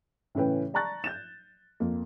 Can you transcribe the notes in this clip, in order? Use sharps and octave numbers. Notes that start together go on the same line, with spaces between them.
A2 C#3 E3 C#4 B4 G5
D5 A5 A#5 C#6 F#6 A6
G6 A6 E7
F2 A#3